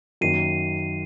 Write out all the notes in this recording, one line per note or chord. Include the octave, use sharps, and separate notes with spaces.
F#2 D#3 A#3 C7 D#7